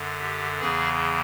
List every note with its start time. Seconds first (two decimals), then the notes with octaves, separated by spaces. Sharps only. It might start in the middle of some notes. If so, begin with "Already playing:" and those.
Already playing: F#2 D3
0.19 G4
0.60 E2 C#3 E3 G#4